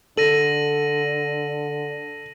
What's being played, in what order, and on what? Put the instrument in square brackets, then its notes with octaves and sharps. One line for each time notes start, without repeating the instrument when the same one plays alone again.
[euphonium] D3 [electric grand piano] A4 [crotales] A#6 D#7 F#7